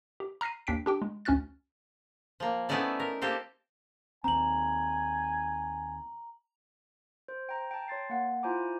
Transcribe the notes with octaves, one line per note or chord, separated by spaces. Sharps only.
G4
A#5 F6 A#6 C7 D#7
D#2 D4 G5 B6 C7 D7
D4 G4 G5
G#3
D2 C#4 F#4 F6 F#6 A6
F3 A#3
A3 B3 C#4 D#4 E4 D5
A#4
A#3 C4 G4 A4
D#2 C4 G#5 A#5 F#7
C5
G5 A#5
G5 A5
C#5 C6 A6 C7
A#3 F#5
E4 F4 C5 G#5 A#5 D6